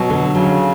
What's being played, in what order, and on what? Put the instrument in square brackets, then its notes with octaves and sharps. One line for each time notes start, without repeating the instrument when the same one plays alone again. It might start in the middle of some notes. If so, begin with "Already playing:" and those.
Already playing: [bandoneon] B2 [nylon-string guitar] F#3
[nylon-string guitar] D3
[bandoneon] C#3 [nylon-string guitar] F#3